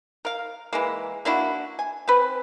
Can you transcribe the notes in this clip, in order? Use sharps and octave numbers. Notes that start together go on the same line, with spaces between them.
A#4 F5
E3 G#3 A#3
A#3 D4 E4 F#4
G#5
C4 B4